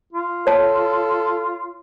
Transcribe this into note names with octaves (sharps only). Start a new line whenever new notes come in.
F4
A4 C#5 A5